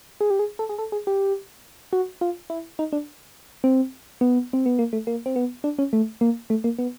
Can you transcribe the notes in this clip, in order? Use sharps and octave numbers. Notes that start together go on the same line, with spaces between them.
G#4
G4
G#4
A4
G#4
A4
G#4
G4
F#4
F4
E4
D#4
D4
C4
B3
C4
B3
A#3
A3
A#3
C4
B3
D4
C#4
A3
A#3
A3
A#3
B3